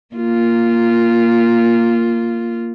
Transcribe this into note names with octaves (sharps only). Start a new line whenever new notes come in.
A#3 F4